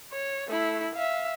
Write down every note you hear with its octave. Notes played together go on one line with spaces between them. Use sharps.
C#5
A3 E4
E5 F5